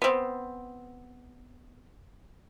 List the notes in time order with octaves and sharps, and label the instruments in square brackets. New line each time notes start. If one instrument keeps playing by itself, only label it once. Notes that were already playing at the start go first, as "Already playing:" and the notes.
[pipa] B3 C4